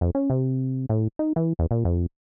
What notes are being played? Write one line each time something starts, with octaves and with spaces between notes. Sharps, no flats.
F2
C#4
C3
A2
D#4
E3
E2
A#2
F2